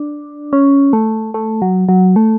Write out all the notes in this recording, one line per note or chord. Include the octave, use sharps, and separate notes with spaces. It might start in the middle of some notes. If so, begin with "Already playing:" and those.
Already playing: D4
C#4
A3
A3
F#3
F#3
A3